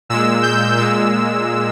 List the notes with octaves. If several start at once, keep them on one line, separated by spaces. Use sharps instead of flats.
A#2 G#3 E6
G6
A#2 G#3 E6